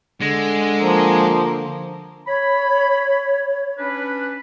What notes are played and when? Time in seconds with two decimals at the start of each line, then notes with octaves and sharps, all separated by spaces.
0.21 D3 G#3
0.79 F3 A#3
2.27 C#5 B5
3.79 C#4 D4 B4